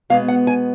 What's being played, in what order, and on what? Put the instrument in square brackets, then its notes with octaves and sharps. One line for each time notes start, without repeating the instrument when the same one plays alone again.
[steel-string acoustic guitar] B2 G#3 B3 F5
F#5
G#5